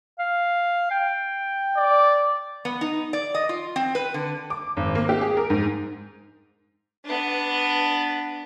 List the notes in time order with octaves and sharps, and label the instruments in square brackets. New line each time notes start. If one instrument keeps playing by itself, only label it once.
[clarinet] F5
G5
[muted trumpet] D5
[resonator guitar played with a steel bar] B3
D#4
D5
D#5
F4
C4
B4
D3
[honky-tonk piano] D6
G#1
A#3
G4
G#4
A#4
G#2
[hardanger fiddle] B3 D4